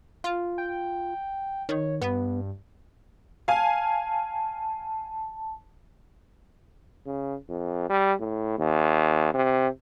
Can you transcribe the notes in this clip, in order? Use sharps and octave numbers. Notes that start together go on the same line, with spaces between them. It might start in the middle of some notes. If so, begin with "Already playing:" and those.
F4
G5
D#3 C#5
G2 B3
F5 G#5 A5
C#3
F2
G3
A2
D#2
C3